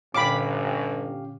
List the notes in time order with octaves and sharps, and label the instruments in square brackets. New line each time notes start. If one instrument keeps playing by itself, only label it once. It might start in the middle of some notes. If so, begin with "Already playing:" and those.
[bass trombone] G1 [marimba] A#2 D3 [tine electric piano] C#4 G4 F5 [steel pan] B5 D6